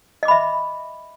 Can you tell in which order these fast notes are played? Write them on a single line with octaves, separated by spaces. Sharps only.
D#5 D6 B5 E5